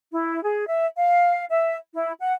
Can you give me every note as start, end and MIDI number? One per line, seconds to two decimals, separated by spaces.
0.12 0.41 64
0.43 0.67 68
0.68 0.85 76
0.97 1.45 77
1.50 1.76 76
1.93 2.13 64
2.19 2.32 78